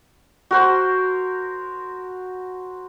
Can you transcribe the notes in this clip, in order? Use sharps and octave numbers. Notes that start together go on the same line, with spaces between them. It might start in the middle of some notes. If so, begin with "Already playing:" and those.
F#4 A#4 C5